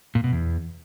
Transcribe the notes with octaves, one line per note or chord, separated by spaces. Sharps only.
A#2
B2
E2